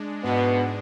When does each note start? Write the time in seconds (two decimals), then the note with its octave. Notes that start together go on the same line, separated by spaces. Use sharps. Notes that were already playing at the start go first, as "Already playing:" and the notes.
Already playing: G#3 D4
0.24 G#2 B2 G#3 B3 D4